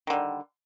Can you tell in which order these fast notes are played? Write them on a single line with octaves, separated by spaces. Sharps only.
D#3 D3 G3